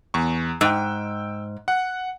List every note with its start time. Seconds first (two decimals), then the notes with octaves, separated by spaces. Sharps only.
0.14 E2 C#6
0.61 G#2 G5 E6
1.68 F#5